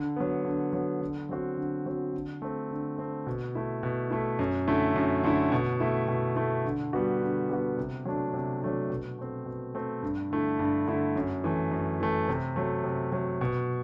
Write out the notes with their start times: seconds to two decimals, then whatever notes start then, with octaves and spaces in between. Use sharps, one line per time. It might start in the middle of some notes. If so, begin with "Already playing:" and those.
Already playing: D3
0.16 F#3 B3
0.45 D3
0.73 F#3 B3
1.01 D3
1.29 F#3 C4 F#4
1.57 D3
1.86 F#3 C4 F#4
2.13 D3
2.42 A3 C4
2.71 D3
2.98 A3 C4
3.27 B2
3.55 A3 E4
3.83 B2
4.10 A3 E4
4.39 F#2
4.67 D3 A3 E4
4.96 F#2
5.24 D3 A3 E4
5.52 B2
5.80 A3 E4
6.08 B2
6.36 A3 E4
6.65 D3
6.93 G3 B3 F#4
7.21 D3
7.49 G3 B3 F#4
7.77 C3
8.05 F#3 A3 D4
8.33 C3
8.62 F#3 A3 D4
8.90 B2
9.19 A3 C4
9.46 B2
9.75 A3 C4
10.02 G2
10.31 D3 A3 E4
10.59 G2
10.87 D3 A3 E4
11.16 F#2
11.44 E3 A3
11.71 F#2
12.00 E3 A3
12.28 C3
12.56 F#3 A3
12.84 C3
13.12 F#3 A3
13.41 B2